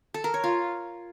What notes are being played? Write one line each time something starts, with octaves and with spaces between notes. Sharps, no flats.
A4
A#4
C#5
F4